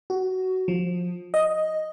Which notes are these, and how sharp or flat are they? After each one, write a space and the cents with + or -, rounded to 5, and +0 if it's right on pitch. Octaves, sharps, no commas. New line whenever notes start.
F#4 +15
F3 +25
D#5 +5